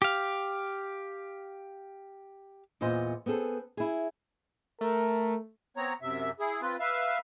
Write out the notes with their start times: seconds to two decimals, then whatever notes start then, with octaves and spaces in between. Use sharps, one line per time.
0.02 G4 F5
2.81 E2 A#2 B3 C5 D#5
3.26 B3 C4 G#4 A4
3.77 E4 G#4
4.81 A3 A#4
5.77 B3 C4 C#5 A#5
6.02 F#2 C3 E5
6.40 E4 G#4
6.62 C4 F4 B4
6.80 B4 E5 F5 E6